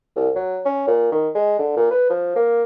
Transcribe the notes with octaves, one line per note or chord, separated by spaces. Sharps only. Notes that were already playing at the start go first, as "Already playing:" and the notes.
C2
F#3
C#4
A#2
D#3
G#3
D3
A#2
B4
F3
A#3